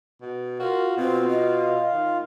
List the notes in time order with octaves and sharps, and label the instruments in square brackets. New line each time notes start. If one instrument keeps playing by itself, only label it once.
[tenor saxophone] B2
[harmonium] F4 F5 [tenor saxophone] F#4 [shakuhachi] A#4
[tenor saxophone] B2 [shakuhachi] C4
[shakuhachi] D#5
[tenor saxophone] D#3